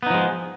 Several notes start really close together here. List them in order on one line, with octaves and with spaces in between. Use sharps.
B3 D#4 F3 G#3